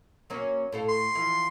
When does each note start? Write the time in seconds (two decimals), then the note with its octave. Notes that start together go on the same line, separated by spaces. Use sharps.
0.30 F#3 A#3 C#4
0.72 A2 A4 F5
0.88 C6
1.15 E3 F3